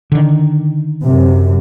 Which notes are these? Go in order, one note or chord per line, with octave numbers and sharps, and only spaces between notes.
D3 D#3
F#2 C3